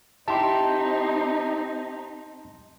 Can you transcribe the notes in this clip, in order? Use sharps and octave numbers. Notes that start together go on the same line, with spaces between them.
C4 D#4 E4 G4 A5 C6